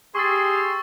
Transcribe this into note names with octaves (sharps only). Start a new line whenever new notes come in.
G4 G#4 C6 C#6 E6 A6